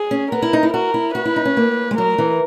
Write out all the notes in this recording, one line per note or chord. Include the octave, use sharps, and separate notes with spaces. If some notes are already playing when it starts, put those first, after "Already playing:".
Already playing: G#4
C#4
B3 A#4
E4
D#4
E4
F#4 A#4
E4
F#4 B4
E4
D#4
C#4
A#3
G#3
F#3 A#4
E3